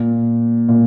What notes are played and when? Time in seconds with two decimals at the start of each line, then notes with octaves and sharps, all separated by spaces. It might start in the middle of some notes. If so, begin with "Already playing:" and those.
Already playing: A#2
0.68 A#2